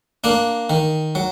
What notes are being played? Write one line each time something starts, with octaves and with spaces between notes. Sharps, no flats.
A#3 D4
D#3
F#3